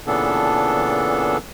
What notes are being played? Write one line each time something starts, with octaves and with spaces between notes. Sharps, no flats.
A#2 C#3 E3 B3 D4 A4